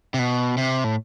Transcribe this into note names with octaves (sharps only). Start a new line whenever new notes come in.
C3
B2
C3
A2